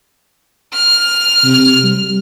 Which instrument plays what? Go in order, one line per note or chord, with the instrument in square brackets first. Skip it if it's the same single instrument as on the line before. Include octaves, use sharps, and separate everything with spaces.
[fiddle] F6
[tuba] C3
G3